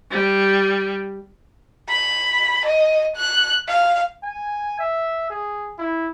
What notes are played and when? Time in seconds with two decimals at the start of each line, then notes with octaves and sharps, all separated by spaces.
0.11 G3
1.89 B5
2.66 D#5
3.16 F#6
3.68 F5
4.23 G#5
4.79 E5
5.30 G#4
5.78 E4